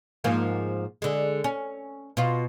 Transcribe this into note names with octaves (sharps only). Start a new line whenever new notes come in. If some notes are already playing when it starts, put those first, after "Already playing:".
G#2 F3 A#3
D3 G#3
C#4
B2 F4